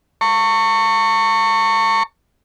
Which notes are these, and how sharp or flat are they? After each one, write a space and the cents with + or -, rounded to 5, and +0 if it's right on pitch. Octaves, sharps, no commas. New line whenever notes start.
A5 +45 C#6 +0